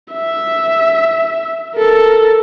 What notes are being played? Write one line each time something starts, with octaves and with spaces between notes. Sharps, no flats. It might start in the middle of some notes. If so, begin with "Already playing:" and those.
E5
A4 A#4